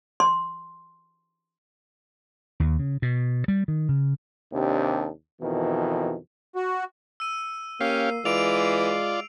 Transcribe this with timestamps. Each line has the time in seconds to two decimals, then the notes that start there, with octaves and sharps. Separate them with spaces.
0.20 C6
2.60 D#2
2.79 C#3
3.02 B2
3.48 G3
3.68 D#3
3.89 C#3
4.52 D#2 C3 D4
5.41 F2 B2 D#3 E3
6.56 F#4
7.20 E6 D#7
7.81 A#3 C#4 G4 F5 C7
8.25 E3 G#3 F4 D5 D7 F7